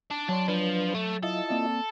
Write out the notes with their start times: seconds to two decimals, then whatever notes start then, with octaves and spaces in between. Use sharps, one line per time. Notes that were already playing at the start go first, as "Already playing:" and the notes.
0.11 D4
0.29 F#3 D4 C#5 C6
0.48 F3 D4 B4
0.95 A3
1.23 E4 F4 A4 D#5
1.49 A#3 C4 D5